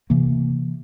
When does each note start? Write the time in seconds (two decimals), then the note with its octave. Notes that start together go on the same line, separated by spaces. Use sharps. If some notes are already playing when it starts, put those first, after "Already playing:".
0.10 C3 E3 A#3